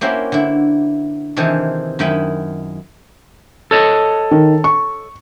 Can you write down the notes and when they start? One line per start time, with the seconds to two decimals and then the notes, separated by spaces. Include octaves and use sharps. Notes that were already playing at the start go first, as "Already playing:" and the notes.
0.01 A#3 C#4 E4 F#4 G4 C5
0.32 D3 E4
1.37 C3 D#3 E3 G#4 A4 C5
1.99 F#2 D#3 E4 D#5 G5 B5
3.71 A4 C#5 D#5
4.31 D#3
4.64 C#6